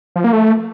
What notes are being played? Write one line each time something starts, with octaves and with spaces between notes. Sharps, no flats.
F3
A#3
A3